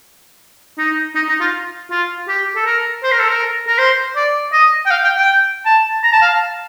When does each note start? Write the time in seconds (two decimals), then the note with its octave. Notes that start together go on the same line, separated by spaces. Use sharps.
0.78 D#4
1.15 D#4
1.29 D#4
1.41 F4
1.91 F4
2.28 G4
2.56 A4
2.65 A#4
3.03 C5
3.12 A#4
3.20 A4
3.28 A#4
3.68 A#4
3.78 C5
4.16 D5
4.53 D#5
4.86 G5
4.91 F5
5.04 G5
5.16 G5
5.65 A5
6.03 A#5
6.12 A5
6.22 F5